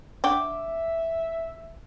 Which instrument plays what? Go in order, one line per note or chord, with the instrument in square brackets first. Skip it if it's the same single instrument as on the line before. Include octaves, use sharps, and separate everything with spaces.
[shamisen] D4 F#5 G5 [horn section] E5 [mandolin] D6